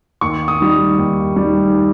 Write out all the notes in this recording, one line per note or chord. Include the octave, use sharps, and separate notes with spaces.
D#2 C#6
D#6
D#3 G3
D#2
D#3 G3